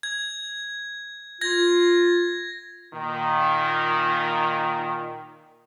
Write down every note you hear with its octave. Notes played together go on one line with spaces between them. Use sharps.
G#6
F4 G#6 A#6
A#2 D#3